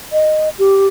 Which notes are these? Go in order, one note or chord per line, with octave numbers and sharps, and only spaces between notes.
D#5
G4